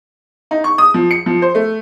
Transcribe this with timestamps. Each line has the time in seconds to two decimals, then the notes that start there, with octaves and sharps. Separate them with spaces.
0.51 D#4
0.64 C#6
0.78 D#6
0.94 F3
1.11 C#7
1.26 F3
1.42 C5
1.55 A3